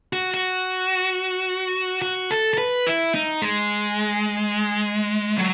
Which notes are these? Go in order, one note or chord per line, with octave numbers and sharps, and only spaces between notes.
F#4
F#4
F#4
A4
A4
B4
E4
D#4
G#3
F#3